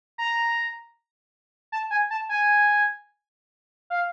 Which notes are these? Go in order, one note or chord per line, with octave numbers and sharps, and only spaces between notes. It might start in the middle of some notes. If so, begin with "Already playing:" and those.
A#5
A5
G#5
A5
G#5
F5